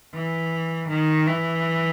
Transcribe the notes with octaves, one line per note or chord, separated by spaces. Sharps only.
E3
D#3
E3